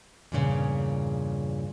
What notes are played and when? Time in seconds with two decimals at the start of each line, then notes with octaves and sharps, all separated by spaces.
0.32 E2 G2 A#2 C#3